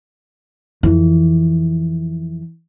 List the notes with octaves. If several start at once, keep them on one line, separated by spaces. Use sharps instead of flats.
F2 E3